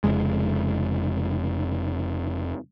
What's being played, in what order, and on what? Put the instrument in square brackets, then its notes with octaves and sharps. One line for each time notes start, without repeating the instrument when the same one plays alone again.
[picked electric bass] F1 F2 C#3 G#3